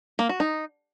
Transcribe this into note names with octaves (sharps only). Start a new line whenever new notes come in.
A#3
F#4
D#4